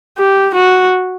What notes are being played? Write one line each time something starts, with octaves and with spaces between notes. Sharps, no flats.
G4
F#4